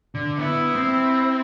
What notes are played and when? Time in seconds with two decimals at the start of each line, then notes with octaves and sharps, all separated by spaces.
0.15 D3
0.39 B3 E4
0.76 C4